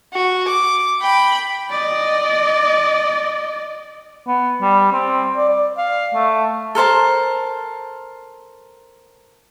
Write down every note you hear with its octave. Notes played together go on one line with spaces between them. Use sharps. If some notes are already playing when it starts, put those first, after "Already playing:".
F#4
D6
G5 B5
D5 D#5
B3
G3
C4
D5
D5
F5
A3
A4 A#4 C5 A5